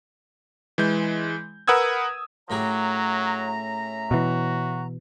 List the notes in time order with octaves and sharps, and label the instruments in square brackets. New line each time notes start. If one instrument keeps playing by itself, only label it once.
[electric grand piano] E3 G#3 G6
A#4 B4 F#5 D#6 E6 G#6
[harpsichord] A2 G4 G#4 [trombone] F#3 [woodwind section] C#4 E5 A#5
[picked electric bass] B2 E3 [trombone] F#4